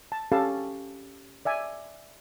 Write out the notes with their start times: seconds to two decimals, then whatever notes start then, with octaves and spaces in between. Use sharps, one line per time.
0.12 A5
0.32 C#4 G4 A4 F5 A5
1.45 D5 E5 G#5